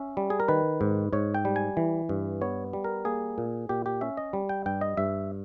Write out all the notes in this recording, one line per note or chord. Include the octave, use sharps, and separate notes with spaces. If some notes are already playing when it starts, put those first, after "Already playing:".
Already playing: C#4 E5
G3
G#4
A#4
D#3 B4
G#2
G#2 C#5
G5
G3
G#5
E3
G2
B3 C#5
G3
A#4
A#3 G#4
A#2
A#2 G4
G4
C#4 E5
D#5
G3
G5
G2 G5
D#5
G2 E5